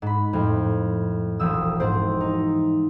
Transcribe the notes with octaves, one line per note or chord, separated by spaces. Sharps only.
G#2 B5
F2 A2
E1 A#1 F3 D#6 E6
G#2 C4 C5
D#4